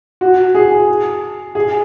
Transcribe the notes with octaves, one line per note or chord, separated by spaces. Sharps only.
F#4
G#4
G#4